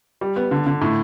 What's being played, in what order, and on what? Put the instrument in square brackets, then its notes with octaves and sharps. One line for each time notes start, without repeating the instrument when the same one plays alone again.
[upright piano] G3
B3
D3
D3
A2